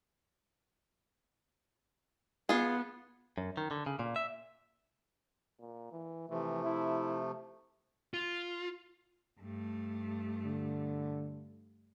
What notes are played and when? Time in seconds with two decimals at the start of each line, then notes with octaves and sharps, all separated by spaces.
2.49 B3 F4 G#4
3.38 F#2
3.57 D#3
3.71 D3
3.86 C#3
3.99 A#2
4.16 E5
5.60 A#2
5.91 E3
6.29 C3 E3 F3 A3
6.64 E4
8.14 F4
9.39 G2 A3
10.45 D3